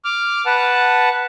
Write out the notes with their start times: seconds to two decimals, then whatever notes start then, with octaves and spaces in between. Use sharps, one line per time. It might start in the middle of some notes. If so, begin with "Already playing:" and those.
0.05 D6 F6
0.46 B4 F#5 A5